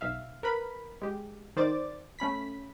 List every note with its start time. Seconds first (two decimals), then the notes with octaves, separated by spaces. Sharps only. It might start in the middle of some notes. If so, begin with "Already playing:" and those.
0.01 B1 E5 F5
0.43 A#4 B4 B5
1.02 G#3 G4
1.56 D#3 C5 D5 D6 A6
2.19 A3 C#4 B5 B6